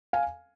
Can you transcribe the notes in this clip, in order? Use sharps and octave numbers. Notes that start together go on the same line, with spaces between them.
F5 G#5